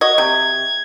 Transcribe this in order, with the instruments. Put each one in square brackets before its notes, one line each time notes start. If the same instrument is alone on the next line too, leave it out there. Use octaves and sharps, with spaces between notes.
[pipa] F#4 D#5 [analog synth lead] G#6
[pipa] C3